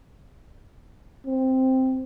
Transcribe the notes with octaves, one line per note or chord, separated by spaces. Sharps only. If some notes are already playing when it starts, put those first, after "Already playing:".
C4